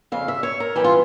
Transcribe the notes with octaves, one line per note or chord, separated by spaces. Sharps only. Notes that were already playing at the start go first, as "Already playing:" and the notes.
F2 C#3 F5
E5
C#5
A#4
G2 E3 G4
F4